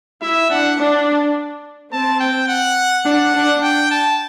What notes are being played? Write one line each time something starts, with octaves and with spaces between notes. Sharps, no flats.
E4 E5
D4 F#5
D4
C4 A5
G5
F#5
D4 F#5
D4
G5
A5